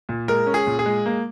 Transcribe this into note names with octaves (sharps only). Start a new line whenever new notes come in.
A#2
G#3 A#4
C#4
G#4
A#2
G#4
G#3
A#3